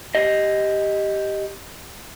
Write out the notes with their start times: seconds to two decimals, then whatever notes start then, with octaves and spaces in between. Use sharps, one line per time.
0.15 G4 D#5